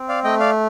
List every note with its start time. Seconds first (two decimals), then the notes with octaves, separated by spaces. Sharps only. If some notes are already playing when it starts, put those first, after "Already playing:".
Already playing: C4
0.09 D5 F5
0.24 A3 D#5 G5
0.40 D5 F5